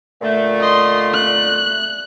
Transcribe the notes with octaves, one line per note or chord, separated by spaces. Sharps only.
A#2 D3 A3
D#5 C6
F#6